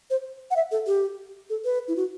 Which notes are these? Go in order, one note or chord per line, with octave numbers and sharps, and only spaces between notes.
C5
F#5
E5
A4
G4
A4
B4
E4
F#4